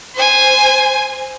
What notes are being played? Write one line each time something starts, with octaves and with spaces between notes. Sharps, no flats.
C5 G#5